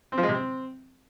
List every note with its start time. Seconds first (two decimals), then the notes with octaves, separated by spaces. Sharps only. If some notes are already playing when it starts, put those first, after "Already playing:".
0.12 C4
0.18 F3
0.23 G#3
0.28 C3
0.34 C4